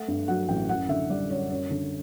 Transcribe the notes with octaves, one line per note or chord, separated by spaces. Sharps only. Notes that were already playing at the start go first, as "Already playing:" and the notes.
Already playing: A3 F#5
G2
F#3 F#5
A1 G5
F#2 F#5
D3 E5
G3 D5
F#2 C#5
F#2 C#5
D3